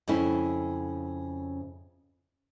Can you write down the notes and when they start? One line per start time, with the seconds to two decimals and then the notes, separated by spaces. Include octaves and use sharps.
0.08 F2 C#3 C#4 E4